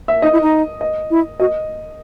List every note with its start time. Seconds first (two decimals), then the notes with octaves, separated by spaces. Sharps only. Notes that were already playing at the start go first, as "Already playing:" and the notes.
0.08 E5
0.22 D#4 D#5
0.33 E4
0.42 D#4
0.81 D#5
1.10 E4
1.40 F#4 D#5